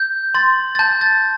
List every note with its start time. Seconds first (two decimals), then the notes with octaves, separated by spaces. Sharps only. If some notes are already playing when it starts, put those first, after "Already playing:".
Already playing: G6
0.34 C6 A6
0.75 A6
0.79 A5 G6
1.01 A6